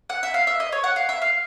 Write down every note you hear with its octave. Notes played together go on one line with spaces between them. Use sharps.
F#5
E5
F5
E5
D#5
C#5
F#5
F5
E5
F5